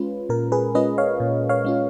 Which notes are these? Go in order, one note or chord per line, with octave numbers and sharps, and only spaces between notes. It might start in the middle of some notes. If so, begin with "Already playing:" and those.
Already playing: G#3 C#4 F4 B4
A#2 A#4
G#4 B4
G#3 C#4 F4 B4 D#5
C#5 F5
A#2
C#5 F5
G#3 C#4 F4